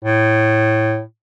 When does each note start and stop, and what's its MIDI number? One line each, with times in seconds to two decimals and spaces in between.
0.05 1.01 45